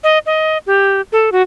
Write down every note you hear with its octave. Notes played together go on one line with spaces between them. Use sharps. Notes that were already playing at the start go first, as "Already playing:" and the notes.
D#5
D#5
G4
A4
F#4